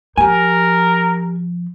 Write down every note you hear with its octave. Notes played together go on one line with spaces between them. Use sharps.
F3 G4 A#4 G#5